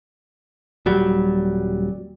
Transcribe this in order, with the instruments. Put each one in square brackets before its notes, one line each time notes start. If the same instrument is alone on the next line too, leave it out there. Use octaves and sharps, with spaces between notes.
[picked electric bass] D#1 F#3 G3